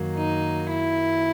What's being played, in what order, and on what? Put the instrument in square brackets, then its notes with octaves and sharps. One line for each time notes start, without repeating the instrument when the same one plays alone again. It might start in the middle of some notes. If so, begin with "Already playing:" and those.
Already playing: [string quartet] F#2 D#3 F#3 A#3
D#4
E4